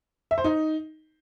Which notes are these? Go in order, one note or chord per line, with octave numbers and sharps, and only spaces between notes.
E5
C5
D#4